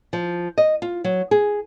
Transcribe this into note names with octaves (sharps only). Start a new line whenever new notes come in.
F3
D#5
F4
F#3
G#4